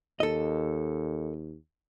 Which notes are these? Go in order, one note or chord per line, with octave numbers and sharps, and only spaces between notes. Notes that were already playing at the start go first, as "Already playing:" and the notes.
D#2 A4 D#5